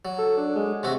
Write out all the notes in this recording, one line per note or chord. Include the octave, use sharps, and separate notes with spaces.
F#3
A4
D4
G#3
C3 A3 F#4